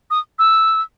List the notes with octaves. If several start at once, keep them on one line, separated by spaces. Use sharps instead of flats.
D#6
E6